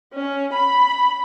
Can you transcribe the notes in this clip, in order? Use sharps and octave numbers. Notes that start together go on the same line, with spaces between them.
C#4
B5